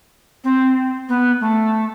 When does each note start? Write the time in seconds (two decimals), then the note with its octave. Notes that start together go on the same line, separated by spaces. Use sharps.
0.44 C4
1.08 B3
1.40 A3